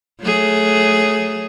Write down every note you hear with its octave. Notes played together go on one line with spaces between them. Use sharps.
F#3 A3 G#4